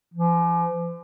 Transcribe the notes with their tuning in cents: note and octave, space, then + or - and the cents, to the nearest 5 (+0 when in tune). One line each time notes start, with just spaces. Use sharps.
F3 -45